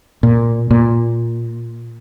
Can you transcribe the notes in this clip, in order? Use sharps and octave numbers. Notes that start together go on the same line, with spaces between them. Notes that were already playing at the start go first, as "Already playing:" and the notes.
A#2
A#2